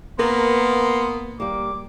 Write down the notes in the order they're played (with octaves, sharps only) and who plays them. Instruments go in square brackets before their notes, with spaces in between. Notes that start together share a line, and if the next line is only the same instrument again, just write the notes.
[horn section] A#3 B3 [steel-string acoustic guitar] A#4 B4 [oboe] C6
[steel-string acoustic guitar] G3 A#3 [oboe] D6